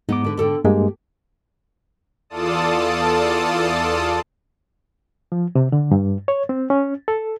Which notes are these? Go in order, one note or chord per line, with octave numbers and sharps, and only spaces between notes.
G#2 B3 D#4 D6
D3 B4
D3 A4 G5
G2 G#3 A#3 G4
E2 F4 A4 D5 A5 D#6
F3
C3
D3
G2
C#5
C4
C#4
A4